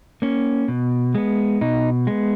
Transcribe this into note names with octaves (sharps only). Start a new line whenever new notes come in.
A#3 C#4
B2
G#3 B3
B2 D#4
G#3 B3